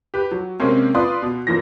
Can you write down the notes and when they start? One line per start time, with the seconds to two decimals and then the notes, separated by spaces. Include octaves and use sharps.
0.14 G4 B4
0.31 F#3
0.60 C3 G#3 A#3 C4 C#4
0.94 F4 B4 D5 C6 D#6
1.22 B2
1.47 F#2 A#2 E3 A#6